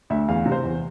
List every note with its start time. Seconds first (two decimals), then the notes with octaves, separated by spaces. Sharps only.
0.10 D2 E5
0.28 E2 F5
0.46 C3
0.52 C5
0.64 E2